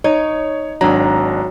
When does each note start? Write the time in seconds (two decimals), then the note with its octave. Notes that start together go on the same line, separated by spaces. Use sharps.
0.04 D#4 C#5
0.81 G#1 F#3 D4 A#5